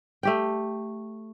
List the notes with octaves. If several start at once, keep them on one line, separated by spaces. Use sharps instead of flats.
A3 G4 G5